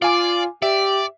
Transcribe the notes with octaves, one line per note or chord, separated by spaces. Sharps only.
F4 D5 F5 G#5 D6
G4 D5 E5